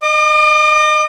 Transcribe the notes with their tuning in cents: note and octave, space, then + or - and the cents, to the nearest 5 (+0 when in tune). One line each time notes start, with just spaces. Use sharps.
D#5 -20 D6 +45